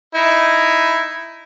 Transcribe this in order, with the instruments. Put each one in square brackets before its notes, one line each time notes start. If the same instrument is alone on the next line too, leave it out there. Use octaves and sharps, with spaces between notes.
[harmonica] D#4 E4